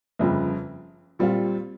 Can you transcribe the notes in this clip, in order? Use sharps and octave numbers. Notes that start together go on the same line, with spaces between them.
G1 F2 C#3
A#2 G3 C4 F4